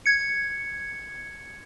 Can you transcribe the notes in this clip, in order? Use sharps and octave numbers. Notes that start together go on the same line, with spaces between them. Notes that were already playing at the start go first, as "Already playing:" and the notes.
G#6 C#7